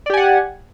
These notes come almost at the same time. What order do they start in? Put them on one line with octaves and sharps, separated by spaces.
D5 G4 G#5 F#5